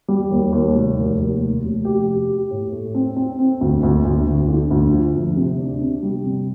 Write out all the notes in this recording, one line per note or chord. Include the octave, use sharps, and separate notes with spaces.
G3
D#2
D#2
F1
D#2
D#2
F1
F1
G4
G4
G4
A2
A3
C4
C4
C4
D2
D2
D2
D2
D3
D2
F3
D2
C3
D4
C3
G3
C3